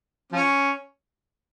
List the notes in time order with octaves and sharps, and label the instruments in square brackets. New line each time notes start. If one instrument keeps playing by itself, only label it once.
[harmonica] F3 C#4